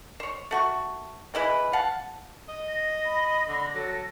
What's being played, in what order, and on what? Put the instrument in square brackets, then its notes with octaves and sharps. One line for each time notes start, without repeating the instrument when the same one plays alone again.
[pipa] C5 C#5
A3 F#4 C#6
E3 G#3 E4 B4
F5 F#5 A5
[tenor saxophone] D#5
[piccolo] A#6
[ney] B5
[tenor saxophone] D3
[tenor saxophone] F#3 [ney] A4